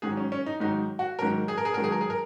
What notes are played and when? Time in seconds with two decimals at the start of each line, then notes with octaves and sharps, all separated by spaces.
0.02 G#2 D#3 F#3 G#4
0.17 C#4
0.32 C#4
0.46 D#4
0.60 G#2 D#3 F#3 D#4
0.99 F#4
1.19 G#2 D#3 F#3 A#4
1.48 G#4
1.58 A#4
1.65 G#4
1.74 G#2 D#3 F#3 A#4
1.84 G#4
1.92 A#4
2.01 G#4
2.10 A#4